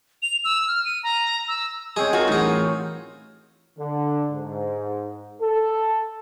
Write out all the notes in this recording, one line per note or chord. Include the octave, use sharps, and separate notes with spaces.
F7
E6
F6
D#7
A#5
E6
G#3 C4 G#4 C#5
F4 F#4 A#4
A1 D#4 G#4
D3
G#2
A4